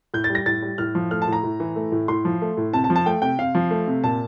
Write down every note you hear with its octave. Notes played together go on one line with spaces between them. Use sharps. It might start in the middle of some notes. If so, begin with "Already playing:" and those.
A2 G6
A6
G3
A#6
A2 A6
G3
A2 F6
F3
A3 F6
A5
A2 A#5
A2
E3
A3
A2
A2 C6
F3
A3
A2
C3 A5
A5
F3
A5
A3 G5
C3 G5
C3 F5
F3
A3
C3
A#2 A5